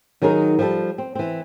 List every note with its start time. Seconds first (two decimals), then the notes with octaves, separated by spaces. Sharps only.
0.22 D#3 F#3 D#4 G#4 A#4
0.59 F3 G3 A4
0.98 C4
1.15 E3 C4